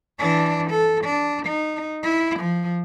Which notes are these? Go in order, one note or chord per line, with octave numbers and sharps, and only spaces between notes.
E3 D4
A4
D4
D#4
E4
F3